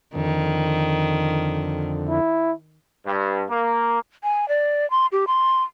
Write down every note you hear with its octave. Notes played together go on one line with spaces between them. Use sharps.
F2 D3 D#3
E4
G2
A#3
G#5
D5
C6
G4
C6